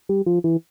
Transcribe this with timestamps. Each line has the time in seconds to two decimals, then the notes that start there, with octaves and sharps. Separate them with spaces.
0.09 G3
0.26 F3
0.44 E3